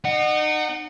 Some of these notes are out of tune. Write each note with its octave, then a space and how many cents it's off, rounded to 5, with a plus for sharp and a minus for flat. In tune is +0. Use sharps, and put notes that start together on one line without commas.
D#4 -35 F#5 +0